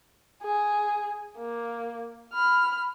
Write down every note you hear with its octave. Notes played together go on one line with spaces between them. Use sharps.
G#4
A#3
B5 F6